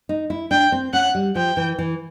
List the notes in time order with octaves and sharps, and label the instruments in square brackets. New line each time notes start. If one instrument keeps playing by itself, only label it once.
[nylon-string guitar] D#4
E4
[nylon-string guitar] D4 [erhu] G5
[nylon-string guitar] C4
[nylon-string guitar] C#4 [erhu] F#5
[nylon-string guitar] G3
[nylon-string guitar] F3 [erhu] G5
[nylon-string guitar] E3
E3